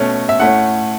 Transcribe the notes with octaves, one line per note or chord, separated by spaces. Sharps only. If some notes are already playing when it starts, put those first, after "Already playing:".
Already playing: B2 A3 C#4
E5
A2 A3 C#4 F#5